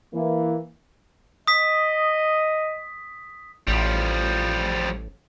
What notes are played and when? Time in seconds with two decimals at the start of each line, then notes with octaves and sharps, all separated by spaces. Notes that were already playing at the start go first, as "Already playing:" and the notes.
0.14 E3 A#3
1.47 D#5 D#6 B6
3.68 A1 F3 G3